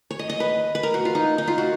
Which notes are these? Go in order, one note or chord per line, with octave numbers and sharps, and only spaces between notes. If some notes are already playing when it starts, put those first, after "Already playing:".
C#5
D#5
D#5
B4
B4
A#4
F#4
F4
D#4
D#4
F4
F#4